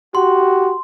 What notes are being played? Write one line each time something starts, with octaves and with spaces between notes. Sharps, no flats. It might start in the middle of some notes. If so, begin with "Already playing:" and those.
F#4 G4 C6